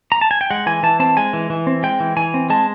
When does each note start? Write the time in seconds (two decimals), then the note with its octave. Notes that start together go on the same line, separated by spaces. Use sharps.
0.12 A#5
0.21 A5
0.31 G#5
0.41 G5
0.51 G#3 F#5
0.66 E3 G#5
0.83 E3 A5
1.00 C4 A5
1.17 G#3 G#5
1.33 E3
1.50 E3
1.67 C4
1.83 G#3 G5
2.00 E3
2.17 E3 G#5
2.34 C4
2.50 G#3 A5